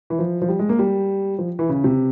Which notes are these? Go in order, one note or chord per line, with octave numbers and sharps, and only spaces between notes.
E3
F3
F3
G3
G#3
A#3
G3
F3
E3
C#3
C3